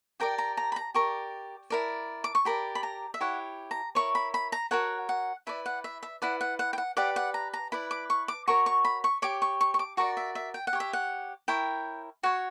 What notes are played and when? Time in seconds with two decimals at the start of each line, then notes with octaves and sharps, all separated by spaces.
0.20 G4 A#4 D5 G5
0.38 A#5
0.57 A#5
0.72 B5
0.76 A#5
0.94 G4 A#4 D5 C#6
1.70 E4 A#4 D5
2.24 D6
2.35 C#6
2.45 G4 A#4 D5 B5
2.75 B5
2.83 A#5
3.14 E5
3.20 E4 G4 C#5 F#5
3.71 A#5
3.95 E4 A#4 C#5 C#6
4.15 B5
4.34 B5
4.52 A#5
4.71 F#4 A#4 C#5 F#5
5.09 F#5
5.47 E4 B4 D5 E5
5.66 F#5
5.84 E5
6.03 E5
6.22 E4 B4 D5 F#5
6.41 F#5
6.59 F#5
6.73 G5
6.78 F#5
6.97 G4 B4 D5 F#5
7.16 F#5
7.34 A#5
7.53 A#5
7.72 E4 B4 D5 B5
7.91 D6
8.10 C#6
8.28 D6
8.48 F#4 A#4 C#5 C#6
8.66 C#6
8.85 B5
9.04 C#6
9.22 G4 C#5 D6
9.42 C#6
9.61 C#6
9.74 C#6
9.79 D6
9.97 F#4 A#4 D5 C#6
10.17 E5
10.35 E5
10.54 G5
10.67 F#5
10.73 G4 C#5
10.80 E5
10.93 F#5
11.48 E4 A#4 C#5 G5
12.23 F#4 C#5 F#5